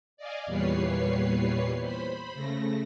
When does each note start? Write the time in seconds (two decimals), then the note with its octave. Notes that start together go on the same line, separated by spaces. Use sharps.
0.17 D5 D#5 F5 G#5
0.46 E2 A#2 G3 B4 C#5 C7
1.82 C5 B5
2.34 C#3 A3 A#6